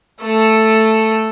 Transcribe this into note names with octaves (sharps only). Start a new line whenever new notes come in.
A3 A4